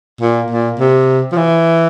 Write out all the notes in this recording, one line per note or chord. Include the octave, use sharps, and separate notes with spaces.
A#2
A#2
C3
F3
E3